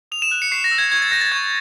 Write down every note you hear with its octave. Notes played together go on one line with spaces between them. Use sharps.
D#6 F7
E7
F#6
C#7
C#6 C7
A#6
E6 G6
G#6
C#6 G#6
A6
E6 G6 A#6
A6
C#6 G#6